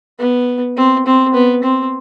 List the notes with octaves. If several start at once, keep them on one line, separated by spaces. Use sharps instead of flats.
B3
C4
C4
B3
C4